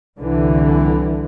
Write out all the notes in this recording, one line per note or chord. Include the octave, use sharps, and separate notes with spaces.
C2 D3 E3